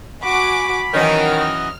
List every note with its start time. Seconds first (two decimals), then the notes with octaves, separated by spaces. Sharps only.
0.23 F#4 G#5 B5 D6
0.94 D#3 E3 F#3 C#4 F6
1.40 D#5